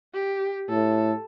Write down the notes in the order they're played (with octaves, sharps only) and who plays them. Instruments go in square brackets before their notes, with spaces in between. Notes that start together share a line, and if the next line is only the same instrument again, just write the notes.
[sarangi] G4
[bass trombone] A2 [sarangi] A4